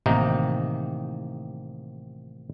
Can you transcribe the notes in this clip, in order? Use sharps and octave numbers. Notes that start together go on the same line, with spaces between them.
A1 C3 D#3 A#3 D#4